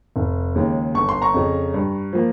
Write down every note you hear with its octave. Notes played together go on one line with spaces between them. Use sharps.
F1
D#2 C#3 G#3
G1 C#6
C6
A#5 C#6
F2 C#3
G2
F3 A#3